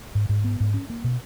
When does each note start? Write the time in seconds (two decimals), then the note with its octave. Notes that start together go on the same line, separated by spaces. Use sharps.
0.15 G#2
0.29 G#2
0.44 B3
0.60 G#2
0.74 C#4
0.90 A#3
1.04 B2